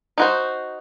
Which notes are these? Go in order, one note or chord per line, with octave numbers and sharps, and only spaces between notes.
D#4 F#4 C5